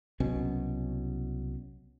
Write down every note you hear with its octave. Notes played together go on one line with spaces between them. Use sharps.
C2 B2 F#3 C#4